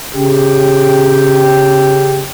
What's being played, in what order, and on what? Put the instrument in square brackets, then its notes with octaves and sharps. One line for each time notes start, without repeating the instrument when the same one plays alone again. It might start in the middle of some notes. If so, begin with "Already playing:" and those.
[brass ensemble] C#3 G4